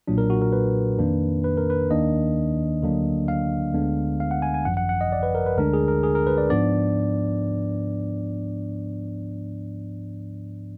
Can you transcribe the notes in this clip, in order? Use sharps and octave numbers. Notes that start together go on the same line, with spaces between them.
B1 A#2 F#3 D4
A#4
F#4
A#4
B4
F2 D#3 A#3 D4
B4
A#4
B4
D#2 D#3 A#3 D4 D#5
D2 D3 F#3 A#3 D4
F5
D2 D3 G#3 B3 D4
F5
F#5
G#5
G#5
G#1 F#2 F3 F#5
F#5
F#5
D#5
D5
B4
A#4
B4
D2 D3 G#3 D4 A#4
G#4
A#4
G#4
A#4
B4
D5
G#2 F3 B3 D4 D5